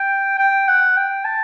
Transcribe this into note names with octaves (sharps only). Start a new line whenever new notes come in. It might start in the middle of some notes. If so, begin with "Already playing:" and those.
Already playing: G5
G5
F#5
G5
A5